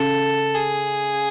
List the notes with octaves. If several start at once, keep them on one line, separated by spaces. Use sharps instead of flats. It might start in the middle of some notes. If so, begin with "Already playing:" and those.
Already playing: C#3 A4
G#4